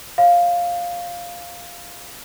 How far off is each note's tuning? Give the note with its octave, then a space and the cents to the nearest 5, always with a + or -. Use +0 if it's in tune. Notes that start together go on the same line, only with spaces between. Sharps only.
C#5 +0 F5 +0